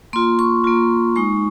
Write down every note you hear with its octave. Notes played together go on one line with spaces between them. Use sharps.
A#3 F4 C6
C#6
A#3 F4
G#3 D#4 C#6